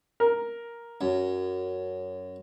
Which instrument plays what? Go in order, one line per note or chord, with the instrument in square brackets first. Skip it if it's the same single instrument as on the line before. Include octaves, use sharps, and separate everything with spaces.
[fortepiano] A#4
[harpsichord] F#2